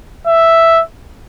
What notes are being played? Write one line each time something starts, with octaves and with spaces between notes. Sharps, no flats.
E5